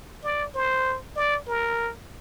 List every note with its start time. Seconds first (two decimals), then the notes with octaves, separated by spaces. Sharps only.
0.24 D5
0.55 C5
1.16 D5
1.48 A#4